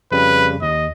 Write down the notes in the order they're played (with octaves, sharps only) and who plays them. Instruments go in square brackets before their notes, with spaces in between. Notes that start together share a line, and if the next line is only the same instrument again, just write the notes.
[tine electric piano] F2 C#3 G3 [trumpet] B4
[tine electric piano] D#2 [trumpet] D#5